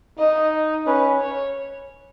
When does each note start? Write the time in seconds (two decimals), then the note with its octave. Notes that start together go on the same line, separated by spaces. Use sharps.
0.18 D#4 D#5
0.86 C#4 B4
1.20 C#5